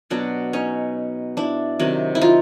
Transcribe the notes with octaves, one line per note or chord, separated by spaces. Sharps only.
B2 F#3 B3 D4
C#4 D#4
D4 E4
C3 D#3 F#3
E4
D#4 F4